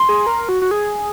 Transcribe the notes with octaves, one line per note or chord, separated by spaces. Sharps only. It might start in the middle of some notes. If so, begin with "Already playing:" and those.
Already playing: C6
G#4
A#4
F#4
F#4
G#4